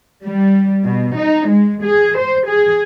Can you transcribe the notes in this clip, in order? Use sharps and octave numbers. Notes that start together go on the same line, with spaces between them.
G3
B2
D#4
G#3
G#4
C5
G#4